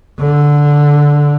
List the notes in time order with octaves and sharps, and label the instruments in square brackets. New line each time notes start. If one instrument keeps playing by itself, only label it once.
[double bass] D3